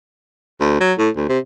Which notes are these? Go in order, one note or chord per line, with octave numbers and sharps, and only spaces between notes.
D2
F#3
A2
D2
C3